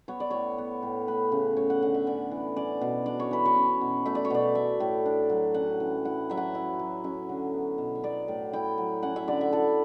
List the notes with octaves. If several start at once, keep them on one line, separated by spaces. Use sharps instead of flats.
B3 C#5
D5
A2 C#5
B3
A2
A3 B4
C#3
A3 C#5
F#5
D3 F#5
E5
C#4 D5
E3
C#4 D5
B2
D4 D5
C#5
E3 B4
C#5
C#4
B2
A3 E5
D5
C#5
B2 D5
A3 E5
A2
D4
F#3
C#4 F#5
E3
E4 F#5
F#3 E5
F#5
E4 E5
F#3
C#4 E5
D3
B3
B2
C#5
B3 D5
A2
E4 G5
F#3
C#4 F#5
E5
D3 D5
E5
E4 A4